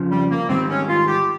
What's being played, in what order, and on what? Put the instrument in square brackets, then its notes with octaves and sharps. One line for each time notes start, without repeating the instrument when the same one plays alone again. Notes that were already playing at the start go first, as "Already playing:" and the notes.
Already playing: [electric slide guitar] F2 C#3 F3
[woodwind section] G3
A#3
[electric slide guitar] G#2 D#3 G3 [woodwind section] C4
[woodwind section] C#4
F4
G4